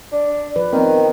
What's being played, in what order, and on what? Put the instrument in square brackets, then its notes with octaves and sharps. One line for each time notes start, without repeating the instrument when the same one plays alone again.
[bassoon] D4
[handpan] F3 B4
[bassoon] D#3 [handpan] B3 C4